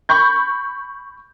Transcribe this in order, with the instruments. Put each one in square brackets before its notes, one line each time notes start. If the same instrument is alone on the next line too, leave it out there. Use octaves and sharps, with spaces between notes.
[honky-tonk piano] B5 C#6 G6